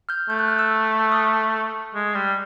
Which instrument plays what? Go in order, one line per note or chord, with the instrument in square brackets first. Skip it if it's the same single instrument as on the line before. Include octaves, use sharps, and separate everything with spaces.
[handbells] F6 G6
[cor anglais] A3 [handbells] G6
[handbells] F#6
F6
E6 F#6
D#6 F6
[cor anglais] G#3
G3